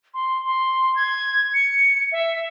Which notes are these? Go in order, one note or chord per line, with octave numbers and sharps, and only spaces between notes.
C6
C6
G#6
C#7
E5